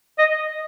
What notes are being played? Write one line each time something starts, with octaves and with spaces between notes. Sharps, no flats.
D#5